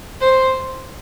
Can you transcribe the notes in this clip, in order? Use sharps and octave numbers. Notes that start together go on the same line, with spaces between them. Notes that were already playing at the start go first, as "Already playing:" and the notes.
C5